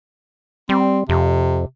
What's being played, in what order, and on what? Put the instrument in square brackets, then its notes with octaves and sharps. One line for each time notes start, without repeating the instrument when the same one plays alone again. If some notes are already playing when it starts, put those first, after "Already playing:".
[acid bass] G3 [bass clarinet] C4
[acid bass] F2 [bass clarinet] C3